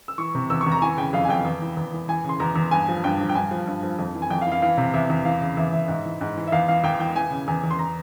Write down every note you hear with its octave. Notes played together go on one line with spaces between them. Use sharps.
E6
E3 C#6
C3
E2 E6
C#6
E2
A#5
E3 G#5
C#3 G5
F2 F5
G#5
F2 G5
E2
E3
E2
E3
E3 G#5
C#3 C6
E2 A#5
E2
G2 G#5
F3
G2 G5
F3
G5
G2 G#5
F3
G2
F3
F2
E3
G#5
F2 G5
F5
E3
F5
E3 F5
C3
E2 E5
E2
E3 F5
C#3
E2 E5
E2 E5
G#2
E3
G#2
E3
E5
E2 F5
E3 F5
E2 G5
E3 G5
E3 G#5
C#3
E2 G#5
E2
C6
A#5